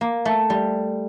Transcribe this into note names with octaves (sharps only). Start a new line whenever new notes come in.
A#3
A3
G3